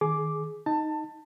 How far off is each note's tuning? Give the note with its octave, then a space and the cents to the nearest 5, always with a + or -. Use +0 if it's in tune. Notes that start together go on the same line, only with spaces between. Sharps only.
D#3 +0 G#4 +20 D6 +0
D#4 +0 A5 +20